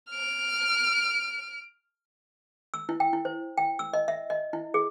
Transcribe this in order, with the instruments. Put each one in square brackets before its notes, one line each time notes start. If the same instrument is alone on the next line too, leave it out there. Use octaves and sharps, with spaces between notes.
[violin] F6 D7
[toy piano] E6
E4
G5
E4
C5
G5
E6
D#5
E5
D#5
E4
G#4